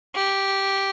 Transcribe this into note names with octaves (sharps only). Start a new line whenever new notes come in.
G4